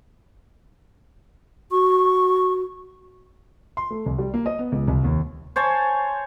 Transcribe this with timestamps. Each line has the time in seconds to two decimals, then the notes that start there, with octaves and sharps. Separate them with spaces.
1.71 F#4 C#6
3.77 C6
3.91 A3
4.06 C2
4.18 G3
4.34 A#3
4.46 D#5
4.59 B3
4.72 C#2
4.88 C2
5.04 D#2
5.56 C5 C#5 G#5 A5